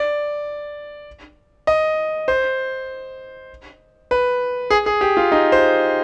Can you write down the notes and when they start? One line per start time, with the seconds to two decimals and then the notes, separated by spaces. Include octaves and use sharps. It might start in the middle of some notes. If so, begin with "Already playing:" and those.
Already playing: D5
1.67 D#5
2.28 C5
4.11 B4
4.70 G#4
4.86 G#4
5.01 G4
5.17 F4
5.32 D#4
5.52 C5